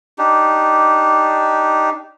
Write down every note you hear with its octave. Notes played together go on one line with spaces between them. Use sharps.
D4 D#4 G4